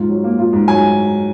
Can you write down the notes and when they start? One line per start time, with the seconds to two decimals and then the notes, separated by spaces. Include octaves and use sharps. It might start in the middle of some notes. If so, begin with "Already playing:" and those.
Already playing: G#2 F4
0.09 F#3
0.24 A#3
0.38 F4
0.53 G#2
0.67 F#3 G#5